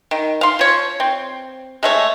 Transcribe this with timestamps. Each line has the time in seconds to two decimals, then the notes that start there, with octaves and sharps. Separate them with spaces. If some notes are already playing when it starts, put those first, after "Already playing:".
0.11 D#3
0.41 F5 C6
0.59 F3 C#5
1.00 C4
1.83 G#3 A3 C#5